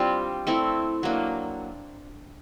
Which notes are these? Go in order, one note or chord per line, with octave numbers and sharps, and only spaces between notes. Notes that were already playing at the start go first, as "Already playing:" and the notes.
Already playing: G3 C4 D4 F4
A3 C4 E4
F#3 A#3 D4